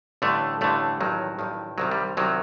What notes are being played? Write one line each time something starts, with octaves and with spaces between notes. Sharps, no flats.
A1 G2 D3 A3
A1 G2 D3 A3
A1 G2 D#3 F#3
A1 G2 D#3
C2 C3 D#3 F#3
G3
C2 C3 D#3 F#3